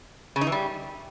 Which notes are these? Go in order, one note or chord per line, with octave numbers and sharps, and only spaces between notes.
C#3
D#4
E3
G3